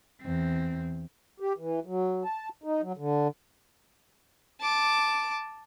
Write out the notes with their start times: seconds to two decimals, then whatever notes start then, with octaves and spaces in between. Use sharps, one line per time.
0.21 E2 C4
1.40 G4
1.58 E3
1.86 F#3
2.24 A5
2.64 D#4
2.81 F#3
2.97 D3
4.61 A5 D6